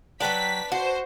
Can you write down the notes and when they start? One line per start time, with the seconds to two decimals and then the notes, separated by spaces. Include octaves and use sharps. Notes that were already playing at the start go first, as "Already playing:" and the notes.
0.21 F#3 D4 B4 G5 B6
0.72 F#4 C5